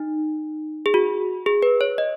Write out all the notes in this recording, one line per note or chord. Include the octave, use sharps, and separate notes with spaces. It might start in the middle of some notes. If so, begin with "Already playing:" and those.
Already playing: D#4
G#4
F#4
G#4
B4
C#5
D#5